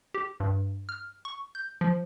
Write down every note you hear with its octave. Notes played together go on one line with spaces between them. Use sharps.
G4
G2
F6
C#6
G6
F3